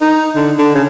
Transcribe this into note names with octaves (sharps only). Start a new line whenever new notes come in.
D#4
D3
D3
C#3